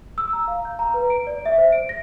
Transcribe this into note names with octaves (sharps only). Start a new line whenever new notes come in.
E6
A#5
F5
G6
A#5
B4
D7
D5
E5
C5
D7
A#6